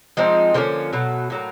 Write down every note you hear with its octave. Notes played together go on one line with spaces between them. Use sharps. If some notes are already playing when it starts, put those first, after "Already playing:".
F3 G#3 C4 D#4
D3 F3 A#3 C#4
B2 F#3 A3
A2 F#3 A#3